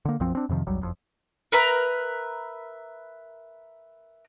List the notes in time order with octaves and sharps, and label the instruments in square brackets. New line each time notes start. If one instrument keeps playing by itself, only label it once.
[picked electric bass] D3 A#3
B1 F#2 F3 C4
C4 D4
F2 C3 D#3 F3
A#1 E2 F#3 G3
F#1 F2
[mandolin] A#4 B4 E5 A#5